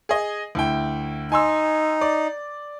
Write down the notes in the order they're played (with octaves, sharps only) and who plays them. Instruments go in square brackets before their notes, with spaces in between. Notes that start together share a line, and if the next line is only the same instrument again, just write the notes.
[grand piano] G#4 D#5
D2 E4 G5
[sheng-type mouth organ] D#4 [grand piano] G#5 C6 E6
[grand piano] D5